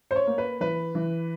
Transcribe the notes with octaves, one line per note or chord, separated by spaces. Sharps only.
C5
C#5
A#3
B4
E3 B4
E3